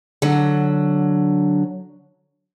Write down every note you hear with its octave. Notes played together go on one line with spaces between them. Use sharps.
D3 F#3